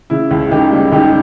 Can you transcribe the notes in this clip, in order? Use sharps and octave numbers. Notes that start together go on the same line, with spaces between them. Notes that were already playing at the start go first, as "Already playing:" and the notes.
C#3 E4
C#2
C#3 D#4 G4
G3
C#2 D#4 G4